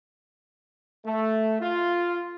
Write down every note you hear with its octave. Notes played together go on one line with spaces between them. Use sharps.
A3
F4